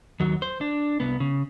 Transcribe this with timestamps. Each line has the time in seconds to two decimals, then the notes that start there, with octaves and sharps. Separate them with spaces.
0.20 D#2 F#3
0.42 C5
0.61 D4
1.00 C2 B3
1.20 C#3